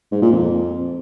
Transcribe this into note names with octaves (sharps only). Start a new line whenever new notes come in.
G#2
A#2
F2